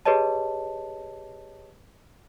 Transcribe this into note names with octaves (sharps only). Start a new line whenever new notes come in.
G4 G#4 B4 C#5 D#5 A5